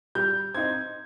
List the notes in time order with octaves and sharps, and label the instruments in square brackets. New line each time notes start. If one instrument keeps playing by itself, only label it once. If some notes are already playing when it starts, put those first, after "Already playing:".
[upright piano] G3 G6
C4 D#4 G#6